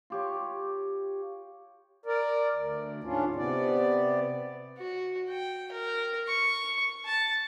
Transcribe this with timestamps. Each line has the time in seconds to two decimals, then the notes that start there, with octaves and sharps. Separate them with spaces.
0.10 F4 G4 C#5
2.06 A#4 D5
2.54 D2
3.04 G#2 C#4 D4 F4
3.36 C3 B3 D5
4.78 F#4
5.30 G5
5.72 A#4
6.27 C#6
7.06 A5